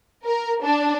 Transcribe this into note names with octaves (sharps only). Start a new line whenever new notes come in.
A#4
D4